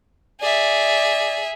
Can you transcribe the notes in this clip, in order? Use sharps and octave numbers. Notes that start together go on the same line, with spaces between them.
G#4 D5 E5